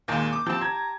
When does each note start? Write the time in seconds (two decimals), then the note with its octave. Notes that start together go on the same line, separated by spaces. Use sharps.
0.08 D#2 A#2 G#3 A#3 G6
0.33 D6
0.46 F3 C4 G4 A5
0.61 A#5 G#6